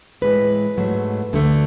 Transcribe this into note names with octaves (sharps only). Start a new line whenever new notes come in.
A2 E3 G#3 B4
G#2 F#3 A3
D2 D3 A3